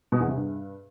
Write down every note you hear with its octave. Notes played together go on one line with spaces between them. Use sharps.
B2
E2
C3
G2